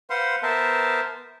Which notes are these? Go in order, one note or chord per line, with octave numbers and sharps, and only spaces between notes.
B4 C5 F5 F#5 C6
B3 A#4 C5 E5 A5